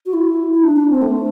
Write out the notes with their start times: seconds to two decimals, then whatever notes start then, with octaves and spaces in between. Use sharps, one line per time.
0.06 F#4
0.13 E4
0.54 E4
0.63 D4
0.76 D4
0.90 C4
1.02 A3